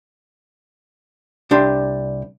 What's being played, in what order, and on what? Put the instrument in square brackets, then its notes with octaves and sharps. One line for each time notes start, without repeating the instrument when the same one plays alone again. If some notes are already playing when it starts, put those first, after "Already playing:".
[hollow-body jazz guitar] C2 D4 G4 C6